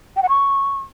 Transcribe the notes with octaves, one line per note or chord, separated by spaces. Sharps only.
G5
F#5
C#6